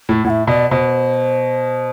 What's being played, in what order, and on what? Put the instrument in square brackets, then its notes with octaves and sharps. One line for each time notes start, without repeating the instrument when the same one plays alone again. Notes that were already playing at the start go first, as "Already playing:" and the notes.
[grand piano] A2
[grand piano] A2 [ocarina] F#5
[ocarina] E5
[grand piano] B2 [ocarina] D5
[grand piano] B2 [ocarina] C5